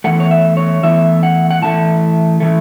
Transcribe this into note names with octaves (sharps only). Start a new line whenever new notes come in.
E2 E3 A3 F#5
C#5
E5
C#5
E2 E3 A3 E5
F#5
F#5
A2 E3 A3 A5
A2 E3 A3